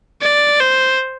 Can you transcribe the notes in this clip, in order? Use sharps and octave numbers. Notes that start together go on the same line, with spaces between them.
D5
C5